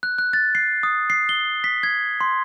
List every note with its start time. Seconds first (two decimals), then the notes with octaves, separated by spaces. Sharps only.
0.03 F#6
0.18 F#6
0.33 A6
0.55 C7
0.83 D#6
1.10 C7
1.29 G7
1.64 B6
1.83 G#6
2.21 C6